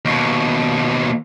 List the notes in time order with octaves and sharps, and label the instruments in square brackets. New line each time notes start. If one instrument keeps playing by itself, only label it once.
[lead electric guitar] D#2 B2